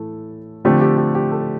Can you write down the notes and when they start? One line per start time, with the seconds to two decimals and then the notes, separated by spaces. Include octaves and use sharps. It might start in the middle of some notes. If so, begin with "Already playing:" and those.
Already playing: A2 E3 A3 A4
0.65 D3 F3 A3 C4 G4
0.81 G4
0.97 G4
1.15 G4
1.31 A4